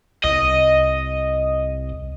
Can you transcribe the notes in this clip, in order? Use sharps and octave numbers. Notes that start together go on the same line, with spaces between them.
C2 D#5